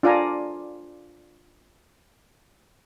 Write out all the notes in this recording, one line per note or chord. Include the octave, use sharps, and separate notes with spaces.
D4 F4 D5 F5 G#5 A#5